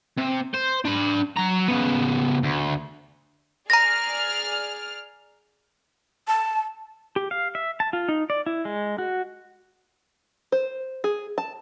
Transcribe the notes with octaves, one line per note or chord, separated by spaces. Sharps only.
C3
C5
D4 B5
F#3 A#5
C#3 B3
D2
G#4 D5 A#5 F6 A#6
A5
G4
F5
E5
A5
F4
D#4
D5
E4
G#3
F#4
C5
G#4
A5